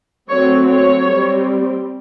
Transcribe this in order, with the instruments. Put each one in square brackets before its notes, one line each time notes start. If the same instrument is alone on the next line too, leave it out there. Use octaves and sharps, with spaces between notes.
[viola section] F#3 A3 C4 C#5
C#5
G3 C4